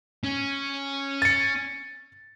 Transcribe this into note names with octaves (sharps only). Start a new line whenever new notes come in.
C#4
A6 C#7